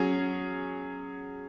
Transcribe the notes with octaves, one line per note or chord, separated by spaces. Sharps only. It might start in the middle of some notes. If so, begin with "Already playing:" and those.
Already playing: F#3 C#4 G#4